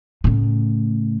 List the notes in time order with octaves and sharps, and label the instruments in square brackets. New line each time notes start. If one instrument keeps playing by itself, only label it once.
[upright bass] A2 C#3